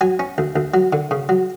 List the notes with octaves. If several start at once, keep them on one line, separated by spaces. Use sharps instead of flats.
F#3 G#5
C#4
D2
D2
F#3
D3
C#3
F#3